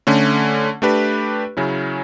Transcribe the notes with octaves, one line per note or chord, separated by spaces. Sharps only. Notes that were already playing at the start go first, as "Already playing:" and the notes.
D3 A3 C#4
A3 D4 G4 B4
C#3 F#3 C#4 E4